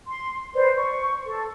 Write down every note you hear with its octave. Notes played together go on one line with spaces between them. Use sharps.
C6
B4 C5 D5
C#6
A4